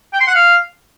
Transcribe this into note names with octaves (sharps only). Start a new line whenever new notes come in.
G5
C6
F#5
F5